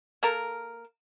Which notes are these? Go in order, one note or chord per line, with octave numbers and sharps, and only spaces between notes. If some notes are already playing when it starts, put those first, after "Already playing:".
A#3 A4 A#4